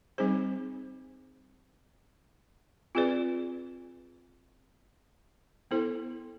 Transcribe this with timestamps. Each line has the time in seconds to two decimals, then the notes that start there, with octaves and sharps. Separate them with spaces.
0.18 G3 C4 D#4 G#4 C5
2.95 C4 F4 G#4 B4 D5
5.71 B3 E4 A4 C5